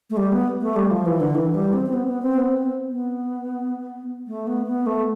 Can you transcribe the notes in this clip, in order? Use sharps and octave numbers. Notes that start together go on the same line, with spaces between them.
A3
G3
B3
A3
G3
F3
E3
D3
E3
G3
C4
C4
B3
B3
C4
B3
C4
B3
A3
B3
B3
A3